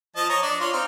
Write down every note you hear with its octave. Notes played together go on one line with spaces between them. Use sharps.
F3 D#5 A5
C#5 D#5 A#5
D4 D5
F4 C#5 C6
C4 D#4 F6